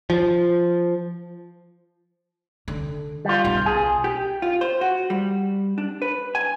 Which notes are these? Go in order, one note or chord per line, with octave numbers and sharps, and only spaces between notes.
F3
D3
G3 F4
B1
G#4
G4
F4
C5
F#4
G3
D4
B4
G#5